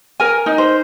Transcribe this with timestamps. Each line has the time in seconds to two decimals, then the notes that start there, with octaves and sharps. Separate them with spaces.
0.20 A#4 G#5
0.46 D#4
0.58 C5